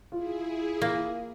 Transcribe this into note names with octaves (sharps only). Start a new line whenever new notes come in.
E4 F4 G#4
A#3